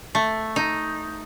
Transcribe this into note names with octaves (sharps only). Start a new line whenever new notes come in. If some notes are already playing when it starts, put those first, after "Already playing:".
A3
D#4